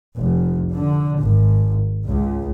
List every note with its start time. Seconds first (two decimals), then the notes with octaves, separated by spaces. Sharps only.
0.18 F1
0.73 D3
1.19 G#1
2.06 C#2